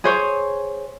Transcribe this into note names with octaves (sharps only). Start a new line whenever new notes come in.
G#4 C5 C#5